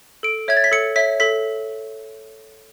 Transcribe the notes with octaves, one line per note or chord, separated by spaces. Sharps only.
A4 D7
C#5 E5 G#6
A6
B6
A4 C#7
C#5 E5 B6
A4 B6